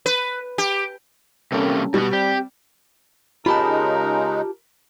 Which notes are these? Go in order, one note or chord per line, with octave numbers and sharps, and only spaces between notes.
B4
G4
C3 G3 A#3 C#4 A4 A#4
B2 G3 B3
C4 G4 D5 G5
C#3 G#3 D#4 F4 G4 A#4 A5 B5